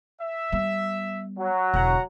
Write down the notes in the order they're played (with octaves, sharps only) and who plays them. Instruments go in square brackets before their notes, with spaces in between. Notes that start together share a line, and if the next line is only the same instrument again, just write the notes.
[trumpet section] E5
[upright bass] G3 B3
[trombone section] F#3
[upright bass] E1 D3 [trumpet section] F#5 A#5